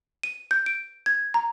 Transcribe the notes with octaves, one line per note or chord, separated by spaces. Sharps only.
D#7
G6
D7
G#6
A#5